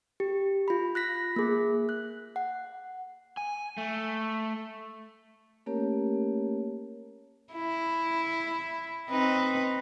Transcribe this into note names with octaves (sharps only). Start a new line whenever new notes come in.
G4
F4 B5
F#6 A#6 B6
A#3 G#4
F#6
F#5
G#5
A3
A3 A#3 C#4 G4 A#4 C#5
E4
C4 D#4 B4